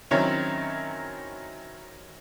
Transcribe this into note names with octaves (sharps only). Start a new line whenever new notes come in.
D#3 F#3 C4 C#4 E4